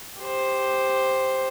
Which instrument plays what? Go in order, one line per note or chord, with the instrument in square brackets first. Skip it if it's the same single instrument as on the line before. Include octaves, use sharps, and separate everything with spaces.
[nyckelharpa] G4 C5